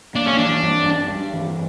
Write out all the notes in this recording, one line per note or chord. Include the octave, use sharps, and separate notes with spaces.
A#3 D4
C#4
E3 D4
G2
G2
G2
E3